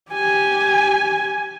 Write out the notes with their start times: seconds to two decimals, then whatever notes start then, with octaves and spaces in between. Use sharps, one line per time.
0.12 G4 G#5